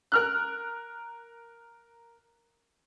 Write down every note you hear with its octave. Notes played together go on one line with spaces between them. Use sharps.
A#4 F6 F#6